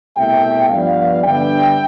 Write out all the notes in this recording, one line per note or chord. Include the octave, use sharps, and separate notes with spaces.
C2 B2 A3 E5 G5
G2 F3 B3 D5 F5
G2 D3 G3 B3 E5 G5